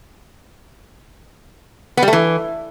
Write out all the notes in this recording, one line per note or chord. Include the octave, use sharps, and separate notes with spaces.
B3
G3
A3
E3